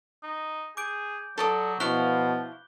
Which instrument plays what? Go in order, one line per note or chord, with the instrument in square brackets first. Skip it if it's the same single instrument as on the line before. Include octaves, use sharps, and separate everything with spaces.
[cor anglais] D#4
[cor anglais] G#4 [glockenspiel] D6 G6 D7
[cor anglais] F#3 [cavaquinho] A4 D5 D#6
[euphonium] B2 [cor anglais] F3 [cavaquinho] E4 F5 C#6 [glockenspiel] F#6 G7